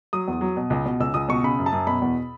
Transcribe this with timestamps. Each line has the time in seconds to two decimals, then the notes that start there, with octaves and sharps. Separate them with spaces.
0.13 F#3 D#6
0.28 E2
0.41 F#3
0.57 B2
0.70 C#2
0.86 B2
1.00 C#2 E6
1.14 C#2 D#6
1.29 B2 C#6
1.43 C#3 B5
1.59 F#2
1.66 A5
1.72 F#2
1.87 B2 B5
2.02 E2